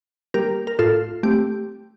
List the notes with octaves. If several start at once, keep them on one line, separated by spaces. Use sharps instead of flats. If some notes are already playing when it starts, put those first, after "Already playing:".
G3 A#3 G4 A#4
A#4
A2 F4 A4
A3 C4 G4